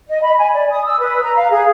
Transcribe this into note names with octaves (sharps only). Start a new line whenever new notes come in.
D#5
B5
G#5
D5
D#6
E6
B4
A#5
F5
G#4